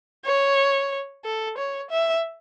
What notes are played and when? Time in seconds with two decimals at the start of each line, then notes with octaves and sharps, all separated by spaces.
0.25 C#5
1.25 A4
1.57 C#5
1.91 E5